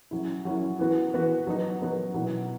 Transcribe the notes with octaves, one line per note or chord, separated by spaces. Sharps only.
F#3 C#4 E4
F#3 C#4 E4
E3 B3 F#4
E3 B3 F#4
F#3 B3 D#4
F#3 B3 D#4
B2 F#3 B3 E4